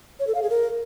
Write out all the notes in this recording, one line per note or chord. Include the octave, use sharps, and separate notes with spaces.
C#5
A4
F5
G#4
A#4